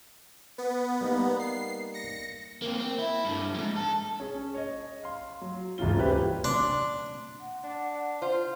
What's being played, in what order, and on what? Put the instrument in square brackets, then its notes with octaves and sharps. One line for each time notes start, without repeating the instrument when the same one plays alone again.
[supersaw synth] B3
[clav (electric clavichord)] G3 A#3 D#4
[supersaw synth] C7
A#6 C#7
[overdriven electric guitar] A#3 C4
C4
E4
G2 D3
F2 G#2
A4
[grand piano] C#4 G#4
C#5 D#5
F5 C6
F#3
D#1 G#2 C#3 E3 F4 G7
G3 C#4 E4 G4 B4 C5
[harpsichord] D4 [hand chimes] C6
[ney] F#5
[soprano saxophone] D4
[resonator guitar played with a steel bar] F4 [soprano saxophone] C5